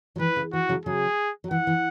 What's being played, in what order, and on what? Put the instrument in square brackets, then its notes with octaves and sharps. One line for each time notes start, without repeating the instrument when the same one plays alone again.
[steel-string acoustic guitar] F#3
[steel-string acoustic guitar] E3 [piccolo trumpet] B4
[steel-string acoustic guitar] C#3
[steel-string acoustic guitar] E3 [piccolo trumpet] F#4
[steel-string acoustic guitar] C#3 F#3
[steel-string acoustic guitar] C#3 F#3 [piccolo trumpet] G#4
[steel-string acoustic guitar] F#3
[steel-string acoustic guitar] E3 [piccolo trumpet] F#5
[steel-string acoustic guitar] E3